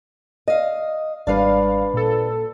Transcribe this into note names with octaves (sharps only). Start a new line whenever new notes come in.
D#5 F5
G#1 G3 D4 B4 F5
A#2 A4